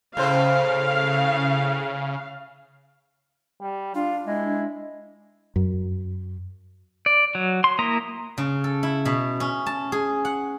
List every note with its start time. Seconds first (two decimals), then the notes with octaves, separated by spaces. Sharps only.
0.17 A2 C#3 C5 F5
3.61 G3
3.95 D4 F4
4.27 G#3 E4
5.56 F#2
7.06 D5
7.35 F#3
7.64 C6
7.79 A#3 E4 A#5 D#6
8.38 C#3
8.64 A4
8.83 E4
9.05 B2
9.40 C#4
9.67 A5
9.92 G#4
10.25 F#5